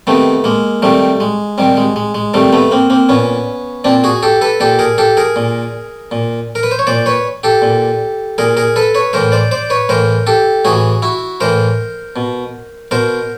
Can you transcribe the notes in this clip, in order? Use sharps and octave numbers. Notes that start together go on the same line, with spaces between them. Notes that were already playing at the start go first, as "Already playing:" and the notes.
C3 D#3 A3 B3
G#3 A#3
C3 D#3 G3 A3
G#3
C3 D#3 G3
G#3
G#3
G#3
C3 D#3 G3 A3
A3 B3
A#3 C4
A#3 C4
A#2 B3 C#4
A#2 C4 D4
F#4 G#4
G4 A4
A4 B4
A#2 G4 A4
G#4 A#4
G4 A4
G#4 A#4
A#2
A#2
A#4
B4
C5
C#5
A#2 C5 D5
B4 C#5
G4 A4
A#2
A#2 G#4 A#4
G#4 A#4
A4 B4
B4 C#5
A2 E3 A#4 C5
C5 D5
C5 D5
B4 C#5
A2 E3 A#4 C5
G4 A4
A2 E3 F#4 G#4
E4 F#4
A2 E3 A#4 C5
B2
B2 A#4 C5